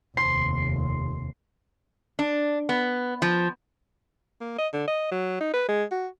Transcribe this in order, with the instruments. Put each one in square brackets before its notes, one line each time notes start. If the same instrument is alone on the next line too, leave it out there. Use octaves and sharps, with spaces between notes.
[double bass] F1 D#2 [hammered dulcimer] C6
[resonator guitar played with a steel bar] D4
B3
F3
[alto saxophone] A#3
D#5
D3
D#5
F#3
D#4
B4
G#3
F#4